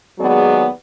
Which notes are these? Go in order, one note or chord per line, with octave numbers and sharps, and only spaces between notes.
D#2 F#3 G#3 B3 G#4 D5